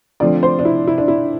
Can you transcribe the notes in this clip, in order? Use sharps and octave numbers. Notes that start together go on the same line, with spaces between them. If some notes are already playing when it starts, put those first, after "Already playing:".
D3 F3 A3 C4 D5
C5
D4
E4
E4
D4
E4